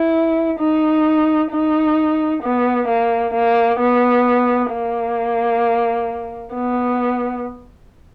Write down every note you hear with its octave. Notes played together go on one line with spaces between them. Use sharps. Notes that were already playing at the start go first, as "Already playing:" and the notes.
Already playing: E4
D#4
D#4
B3
A#3
A#3
B3
A#3
B3